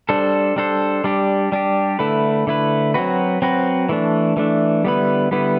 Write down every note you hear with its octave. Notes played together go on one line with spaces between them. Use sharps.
G3 D4 A4 C5
G3 D4 A4 C5
G3 D4 G4
G3 D4 G4
D3 A3 E4 B4
D3 A3 E4 B4
F#3 C4 F#4 B4
F#3 C4 F#4 B4
E3 A3 D4
E3 A3 D4
D3 G3 B3 E4 B4
D3 G3 B3 E4 B4